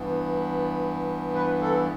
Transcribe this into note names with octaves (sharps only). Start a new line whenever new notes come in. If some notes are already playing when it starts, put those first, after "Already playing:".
Already playing: G2 E3 B3
B4
A4